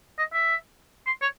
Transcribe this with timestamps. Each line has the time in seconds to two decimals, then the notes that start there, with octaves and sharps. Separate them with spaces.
0.18 D#5
0.33 E5
1.07 C6
1.22 C#5